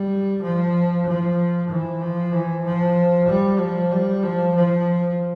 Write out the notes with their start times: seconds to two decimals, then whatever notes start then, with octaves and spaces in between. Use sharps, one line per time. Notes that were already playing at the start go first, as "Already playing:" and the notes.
Already playing: G3
0.43 F3
1.06 F3
1.69 E3
2.02 F3
2.33 E3
2.65 F3
3.29 G3
3.59 F3
3.91 G3
4.23 F3
4.55 F3